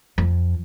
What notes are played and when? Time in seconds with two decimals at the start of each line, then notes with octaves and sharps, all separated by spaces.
0.18 F2